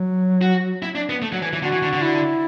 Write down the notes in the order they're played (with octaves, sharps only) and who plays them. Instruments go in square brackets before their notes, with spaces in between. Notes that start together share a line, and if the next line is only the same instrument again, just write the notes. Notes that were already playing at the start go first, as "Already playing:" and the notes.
Already playing: [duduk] F#3
[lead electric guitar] F#4
E4
D4
B3
A3
F#3
E3
E3
[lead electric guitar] D3 [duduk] F#4
[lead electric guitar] E3
D3
D3
[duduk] E4